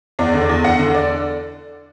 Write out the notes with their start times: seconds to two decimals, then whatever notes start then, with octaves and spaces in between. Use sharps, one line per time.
0.19 E2 D5
0.34 D3
0.42 D5
0.49 E2
0.64 E2 F#5
0.79 D3
0.95 D5